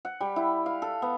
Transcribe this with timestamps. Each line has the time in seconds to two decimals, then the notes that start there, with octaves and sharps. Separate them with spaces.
0.05 F#5
0.20 G3
0.36 E4
0.66 F5
0.82 A4
1.02 B3